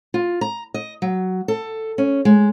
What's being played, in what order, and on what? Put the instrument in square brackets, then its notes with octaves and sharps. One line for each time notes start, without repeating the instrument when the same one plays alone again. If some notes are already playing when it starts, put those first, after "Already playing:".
[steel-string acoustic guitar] F4
A#5
D#5
F#3
A4
C#4
G#3